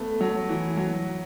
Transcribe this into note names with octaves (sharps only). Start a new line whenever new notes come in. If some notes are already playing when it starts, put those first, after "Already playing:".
Already playing: A3 B3
F#3
E3
F#3